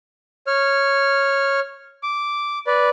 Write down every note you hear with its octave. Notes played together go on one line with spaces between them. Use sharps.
C#5 F6
D6
B4 D5